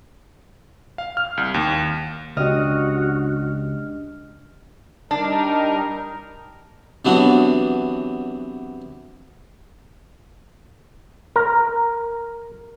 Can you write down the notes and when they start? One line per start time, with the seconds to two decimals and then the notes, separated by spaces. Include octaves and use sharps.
0.98 F5
1.17 F6
1.37 C2
1.54 D#2
2.37 C#2 D4 F#4 G4 D#5 F6
5.11 G3 D4 D#4 A#4
7.05 C3 E3 F#3 B3 D4 F#4
11.36 A#4